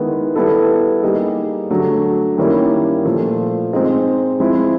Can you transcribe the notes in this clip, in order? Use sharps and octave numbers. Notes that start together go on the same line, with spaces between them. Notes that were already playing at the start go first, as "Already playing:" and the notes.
Already playing: D#3 G#3 B3 E4
G3 B3 E4 A4
G3 A#3 D#4 G#4
D3 F#3 A3
D#3 G3 A#3 C#4 E4
A#2 F3 A3
G#3 C4 D#4 G#4
F3 G#3 C4 E4